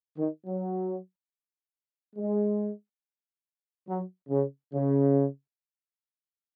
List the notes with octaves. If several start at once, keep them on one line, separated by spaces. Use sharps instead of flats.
D#3
F#3
G#3
F#3
C#3
C#3